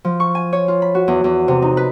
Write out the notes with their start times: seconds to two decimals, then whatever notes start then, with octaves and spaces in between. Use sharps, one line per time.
0.05 F3
0.20 C#6
0.35 G#5
0.53 C#5
0.68 F4
0.82 B5
0.95 F#4
1.08 E2
1.24 E2
1.48 C3
1.62 D#4
1.77 B4